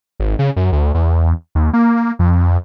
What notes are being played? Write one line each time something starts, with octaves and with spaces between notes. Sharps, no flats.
G#1
C#3
F#2
D2
E2
D#2
A#3
F2